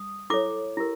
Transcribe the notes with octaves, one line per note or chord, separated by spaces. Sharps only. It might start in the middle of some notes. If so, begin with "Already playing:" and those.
Already playing: D#6
E4 A4 C#5 D6
E4 G4 A#4